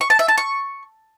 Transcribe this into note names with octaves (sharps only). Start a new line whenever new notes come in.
C#6
A5
E5
A5
C#6